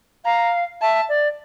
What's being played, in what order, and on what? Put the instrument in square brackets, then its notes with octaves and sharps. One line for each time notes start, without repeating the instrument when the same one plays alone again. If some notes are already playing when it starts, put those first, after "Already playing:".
[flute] F5 [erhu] A#5
[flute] E5 [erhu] A5
[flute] D5